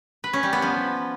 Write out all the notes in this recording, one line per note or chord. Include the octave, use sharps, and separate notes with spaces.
B4
C#4
G3
B3
F3